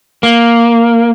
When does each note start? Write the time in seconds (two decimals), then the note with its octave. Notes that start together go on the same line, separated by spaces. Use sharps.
0.23 A#3